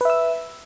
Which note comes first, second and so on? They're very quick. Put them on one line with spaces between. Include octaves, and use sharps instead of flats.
B4 E5 E6